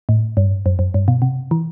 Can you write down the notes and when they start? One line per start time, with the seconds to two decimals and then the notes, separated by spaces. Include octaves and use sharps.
0.09 A2
0.37 G2
0.66 F#2
0.79 F#2
0.94 G2
1.08 B2
1.22 C3
1.51 E3